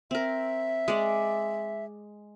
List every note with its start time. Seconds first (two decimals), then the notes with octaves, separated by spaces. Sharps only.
0.11 C4 A#4 E5
0.88 G#3 D5